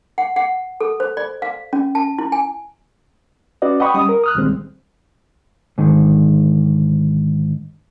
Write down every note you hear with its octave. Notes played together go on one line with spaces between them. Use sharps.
F#5
F#5
A4
C5
D5
F5
C#4
A5
E4
G#5
C#4 F#4 B4 D5 D#5
D#5 F#5 G5 B5 C#6 D#6
G3 C#4 D#6
A#4
D#6 F6 F#6
C2 A#2 D#3 G3 G#3 C4
G#2 D3 D#3